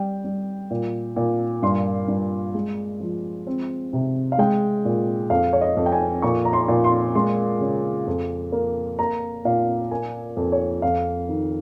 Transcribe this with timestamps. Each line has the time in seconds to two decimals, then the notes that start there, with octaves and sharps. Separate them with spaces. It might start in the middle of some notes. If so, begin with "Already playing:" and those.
Already playing: G3 G5
0.24 G3
0.70 A#2
1.16 A#2
1.63 G2 C6
2.08 G2
2.55 G#3
3.00 F3
3.47 C4
3.93 C3
4.32 F5
4.38 G#3 G5
4.85 A#2
5.30 F2 F5
5.53 C#5
5.61 D#5
5.77 F2
5.86 G5
5.92 G#5
6.22 A#2 C#6
6.45 A#5
6.53 C6
6.68 A#2
6.84 C6
7.15 G#3 C6
7.60 C#3
8.07 F2
8.52 A#3
8.99 A#3 A#5
9.45 A#2 F5
9.91 A#3 G#5
10.37 F2
10.52 C#5
10.82 F2 F5
11.29 D#3